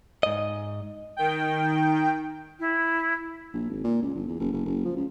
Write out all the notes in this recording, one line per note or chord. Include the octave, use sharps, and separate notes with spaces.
G#2 D#5
D#3 G5
E4
A#1
G#1
A#2
C#2
G1
E2
F#1
F#1
F#1
F3
C#2